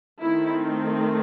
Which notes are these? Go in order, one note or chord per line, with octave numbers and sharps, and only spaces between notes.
D#3 A3 C4 E4